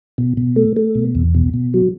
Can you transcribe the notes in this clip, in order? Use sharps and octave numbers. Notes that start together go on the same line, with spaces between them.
B2
B2
A3
A3
B2
E2
B2
B2
F#3